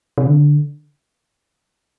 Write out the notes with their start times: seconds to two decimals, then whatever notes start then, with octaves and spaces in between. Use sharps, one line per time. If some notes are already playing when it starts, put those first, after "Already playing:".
0.18 C3
0.27 D3